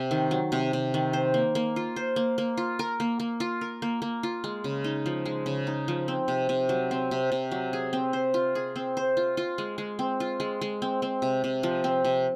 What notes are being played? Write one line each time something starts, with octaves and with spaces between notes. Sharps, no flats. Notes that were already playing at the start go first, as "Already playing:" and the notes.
Already playing: C3
D#3
F#3
C3
C3
D#3
C5
A#3
A#3
F4
C5
A#3
A#3
F4
A#4
A#3
A#3
F4
A#4
A#3
A#3
F4
G#3
C#3
D#4
F3
G#3
C#3
D#4
F3
C4
C3
C3
F#3
C4
C3
C3
F#3
G#4
C4
C5
F4
G#4
C4
C5
F4
F4
G#3
G#3
C4
F4
G#3
G#3
C4
C4
C3
C3
F3
C4
C3